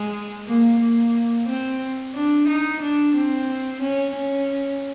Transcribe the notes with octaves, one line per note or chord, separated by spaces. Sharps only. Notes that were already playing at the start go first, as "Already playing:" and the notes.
Already playing: G#3
A#3
A#3
C4
D4
D#4
D4
C4
C#4
C#4